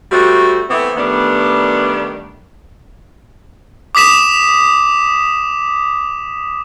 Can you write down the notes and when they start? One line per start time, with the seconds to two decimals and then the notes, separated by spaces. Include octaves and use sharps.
0.11 G3 A3 C4 F#4
0.69 E3 A3 B3 C4 E5
0.97 D#3 G3 A3 B3 D4
3.95 D6 D#6 B6 E7